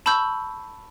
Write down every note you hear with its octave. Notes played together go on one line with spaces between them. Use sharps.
A5 B5 C#6 E6 G6